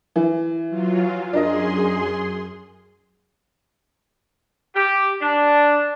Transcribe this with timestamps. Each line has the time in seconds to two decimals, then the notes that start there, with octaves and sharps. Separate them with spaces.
0.16 E3
0.69 F#3 F4
1.33 F#2 D4 G#4 A#4 D#5 C6
4.75 G4
5.22 D4